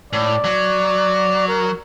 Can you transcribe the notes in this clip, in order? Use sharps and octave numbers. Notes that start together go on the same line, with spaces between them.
A2 D5
F#3
A#4